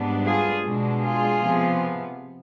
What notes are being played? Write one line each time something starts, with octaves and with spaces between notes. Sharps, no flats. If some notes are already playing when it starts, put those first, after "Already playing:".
Already playing: G#2 G3 B3 D4
F4 G#4
B2 G#3 D4
F4 G#4
C3 F3 B3